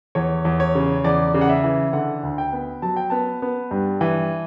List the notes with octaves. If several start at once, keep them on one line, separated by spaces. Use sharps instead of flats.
E2 C#5
E2
C#5
C#3
E2 D5
C#3
F#5
E5
E3
D3 F#5
D2
G5
B3
F#3 A5
G5
B3 A5
B3
G2
E3